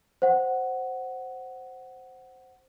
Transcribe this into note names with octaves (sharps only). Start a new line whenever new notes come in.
C5 F#5